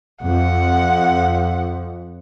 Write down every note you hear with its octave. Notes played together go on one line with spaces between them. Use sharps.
F2 F#5